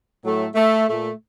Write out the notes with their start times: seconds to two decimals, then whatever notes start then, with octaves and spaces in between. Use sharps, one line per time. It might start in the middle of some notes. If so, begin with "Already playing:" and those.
0.24 A2 F#3 A3
0.55 A3
0.88 A#2 A3